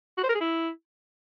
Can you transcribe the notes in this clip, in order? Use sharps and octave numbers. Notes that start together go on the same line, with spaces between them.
F#4
C5
A#4
G#4
E4